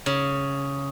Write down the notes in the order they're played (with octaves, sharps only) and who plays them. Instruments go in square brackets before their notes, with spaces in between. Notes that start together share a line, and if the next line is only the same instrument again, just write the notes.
[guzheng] C#3